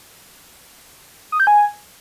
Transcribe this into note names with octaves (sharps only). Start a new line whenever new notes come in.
D#6
G6
G#5